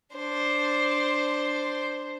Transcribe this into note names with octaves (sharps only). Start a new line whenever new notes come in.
D4 C5